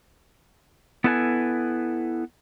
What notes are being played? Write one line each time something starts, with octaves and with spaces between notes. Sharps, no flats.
B3 E4 A4 B4 D5 G#5